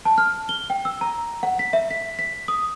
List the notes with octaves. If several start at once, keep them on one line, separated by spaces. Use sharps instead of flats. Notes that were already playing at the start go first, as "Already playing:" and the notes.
A5
F6
G7
G5
E6
A#5
F#5
B6
E5
B6
B6
D#6